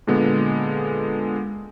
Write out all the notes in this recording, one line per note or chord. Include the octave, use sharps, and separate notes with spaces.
A#2 D3 G#3 B3